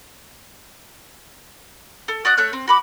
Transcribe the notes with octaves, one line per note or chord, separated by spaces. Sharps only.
A4
F#4 D5 D#6 F#6
A3 C#5 F#6 G6
C4
F#4 B5 D6